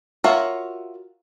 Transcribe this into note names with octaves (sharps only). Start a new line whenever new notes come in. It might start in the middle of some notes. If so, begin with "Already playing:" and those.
F4 F#4 A#4 C#5 E5